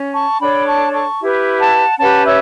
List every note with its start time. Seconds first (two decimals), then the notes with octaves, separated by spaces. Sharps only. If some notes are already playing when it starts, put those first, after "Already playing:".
Already playing: C#4
0.14 A5 C#6
0.40 D4 A4 C#5 G5 B5
0.67 A5 C#6
0.93 A5 C#6
1.20 E4 G4 B4
1.59 F#5 A5
1.99 C#4 G4 B4 F#5 A5
2.25 C#5 E5